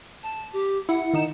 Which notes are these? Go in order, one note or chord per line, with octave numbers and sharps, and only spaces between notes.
A5
G4
E4 F#5
D#3 D#4 E7